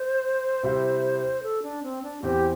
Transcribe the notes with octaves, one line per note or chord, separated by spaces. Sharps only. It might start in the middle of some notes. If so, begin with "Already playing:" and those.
Already playing: C5
C3 G3 E4
A4
D4
C4
D4
E2 E3 C4 G4